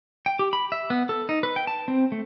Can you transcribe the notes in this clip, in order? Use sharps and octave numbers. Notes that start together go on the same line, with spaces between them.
G5
G4
B5
E5
B3
A4
D#4
B4
G5
A5
C4
A3